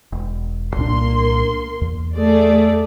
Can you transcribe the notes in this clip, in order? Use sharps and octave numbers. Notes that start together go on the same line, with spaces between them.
E1
C2 A#2 A#3 D4 C6
E2
A3 G#4 D5